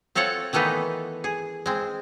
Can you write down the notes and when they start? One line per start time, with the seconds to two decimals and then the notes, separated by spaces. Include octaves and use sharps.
0.15 C4 F4 A4 C#5 F#5
0.53 D#3 E3 A3 B3 D#4
1.24 G#4
1.66 G#3 C4